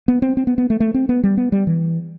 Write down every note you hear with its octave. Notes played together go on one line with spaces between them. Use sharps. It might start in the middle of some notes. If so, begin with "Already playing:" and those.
B3
C4
C4
B3
B3
A3
A3
C4
B3
G3
B3
G3
E3